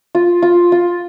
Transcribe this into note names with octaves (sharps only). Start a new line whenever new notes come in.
F4
F4
F4